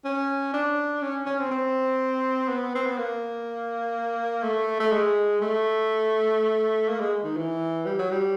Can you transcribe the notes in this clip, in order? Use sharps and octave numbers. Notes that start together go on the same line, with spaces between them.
C#4
D4
C#4
C#4
C4
C4
B3
C4
B3
A#3
A3
A3
G#3
A3
A#3
G#3
D#3
E3
G3
F#3
G3